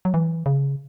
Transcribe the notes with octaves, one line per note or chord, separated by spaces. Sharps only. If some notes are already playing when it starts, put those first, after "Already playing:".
F#3
E3
C#3